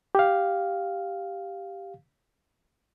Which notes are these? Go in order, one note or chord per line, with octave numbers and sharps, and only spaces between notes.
G4 F5